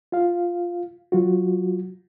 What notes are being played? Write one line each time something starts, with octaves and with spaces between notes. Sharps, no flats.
F4 F5
F#3 F4 F#4